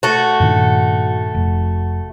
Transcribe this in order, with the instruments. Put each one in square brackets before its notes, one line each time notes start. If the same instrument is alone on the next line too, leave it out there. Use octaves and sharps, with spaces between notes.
[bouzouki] A3 F#4
[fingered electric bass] G2 A#2 D#3
F1